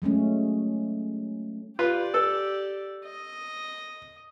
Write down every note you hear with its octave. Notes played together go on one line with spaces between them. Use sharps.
F#3 G#3 A3 C#4
F4 G4 B4 D5
A4 E6
D#5